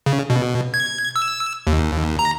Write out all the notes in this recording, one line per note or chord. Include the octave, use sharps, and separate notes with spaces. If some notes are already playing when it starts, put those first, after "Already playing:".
C#3
B2
G#6
E6
D#2
A#5